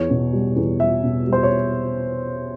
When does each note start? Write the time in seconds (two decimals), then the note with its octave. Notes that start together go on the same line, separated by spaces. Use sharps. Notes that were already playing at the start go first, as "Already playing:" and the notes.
Already playing: E2 C#5
0.10 B2
0.33 G3
0.56 E2
0.79 G3 E5
1.03 B2
1.26 G3
1.33 C5
1.43 C#5